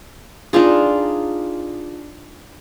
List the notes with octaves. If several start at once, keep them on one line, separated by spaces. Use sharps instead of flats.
D4 D#4 F4 G#4